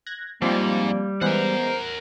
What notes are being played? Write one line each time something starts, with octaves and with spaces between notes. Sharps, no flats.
F#6 G#6 A#6
G#2 F3 G3 A#3 C4 D5
E3 G#3 B3 A#4 C5 F#5